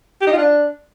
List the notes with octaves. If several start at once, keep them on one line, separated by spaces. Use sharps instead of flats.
G4
D#4
F4
D4